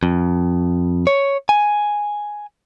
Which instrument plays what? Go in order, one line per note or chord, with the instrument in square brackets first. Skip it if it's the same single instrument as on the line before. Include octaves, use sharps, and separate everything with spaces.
[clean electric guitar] F2
C#5
G#5